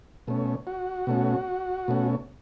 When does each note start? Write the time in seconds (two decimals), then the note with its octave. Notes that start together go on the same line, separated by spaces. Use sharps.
0.27 B2 A3 C#4
0.67 F#4
1.07 B2 A3 C#4
1.88 B2 A3 C#4